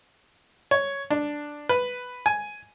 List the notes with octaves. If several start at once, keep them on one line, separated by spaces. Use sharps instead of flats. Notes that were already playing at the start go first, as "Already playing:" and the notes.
C#5
D4
B4
G#5